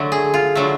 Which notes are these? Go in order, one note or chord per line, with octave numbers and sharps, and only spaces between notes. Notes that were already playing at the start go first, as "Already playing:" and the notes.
Already playing: D3 F#3 A3
G#4
F4
D3 F#3 A3